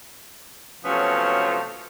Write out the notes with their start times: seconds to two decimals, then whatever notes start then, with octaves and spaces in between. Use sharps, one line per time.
0.85 C3 F3 F#3 A3 B3 C#4